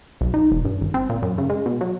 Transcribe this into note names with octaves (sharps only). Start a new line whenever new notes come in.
B1
D#4
E1
G2
G#1
C4
A#2
F#2
C#3
G#3
B2
F#3